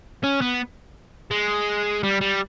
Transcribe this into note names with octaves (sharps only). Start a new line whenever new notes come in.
C#4
B3
G#3
G3
G3